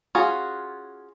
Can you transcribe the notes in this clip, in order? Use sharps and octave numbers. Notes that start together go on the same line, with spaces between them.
C#4 F4 F#4 G#4